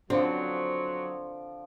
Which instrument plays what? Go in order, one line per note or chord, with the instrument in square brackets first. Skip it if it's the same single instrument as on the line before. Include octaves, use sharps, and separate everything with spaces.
[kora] D3 [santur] F3 D5 C6 [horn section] F#3 [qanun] C4